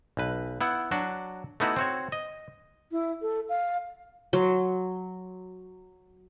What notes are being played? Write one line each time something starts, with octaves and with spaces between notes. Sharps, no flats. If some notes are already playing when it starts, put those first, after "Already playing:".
B1 B4
B3 E4 F#5
F#3 D4 F#4
A3 B3 D#4 E4 F#4
C4 F#4 C#5
D#5
E4
A4
F5
F#3 C6